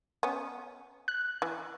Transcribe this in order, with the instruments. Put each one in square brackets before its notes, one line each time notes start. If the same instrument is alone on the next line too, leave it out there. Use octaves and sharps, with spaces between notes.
[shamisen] B3 C#4
[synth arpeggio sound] F#6
[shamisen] E3